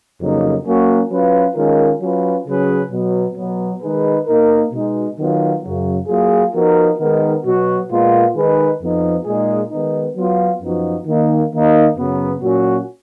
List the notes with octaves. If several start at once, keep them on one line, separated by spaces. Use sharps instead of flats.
F2 C#3 F#3 A#3 D#4
F#3 A#3 C#4 F#4
F#3 C#4 F4 B4
D#3 G#3 C#4 F4 A#4
F#3 C#4 F4 B4
C#3 F#3 C#4 G#4 B4
B2 F#3 B3
B2 F#3 B3
D#3 G#3 D#4 G#4 B4
B2 A#3 D#4 A#4
B2 G#3 D#4
D#3 F#3 B3 F4
F#2 C#3 F#3
F#3 A#3 F4 G#4
F3 B3 D#4 F#4 A#4
D#3 G#3 B3 D#4 A#4
B2 F#3 B3 F#4
A#2 G#3 B3 F4 A#4
D#3 G#3 D#4 G#4 B4
F2 F3 B3 D#4
A#2 G#3 D#4 G#4
D#3 G#3 B3 D#4
F#3 B3 F4
F#2 F3 B3 D#4 F#4
D#3 A#3 D#4
D#3 A#3 D#4
F#2 C#3 F#3 B3
A#2 F#3 C#4 F#4